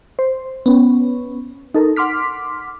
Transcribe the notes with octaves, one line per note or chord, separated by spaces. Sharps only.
C5
B3 C#4
D#4 A4 A#4
F#5 C6 D6 F6 B6